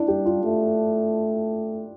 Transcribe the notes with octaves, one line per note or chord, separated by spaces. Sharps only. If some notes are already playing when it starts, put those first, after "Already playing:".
Already playing: D4 E4
G3 G4
F4
A3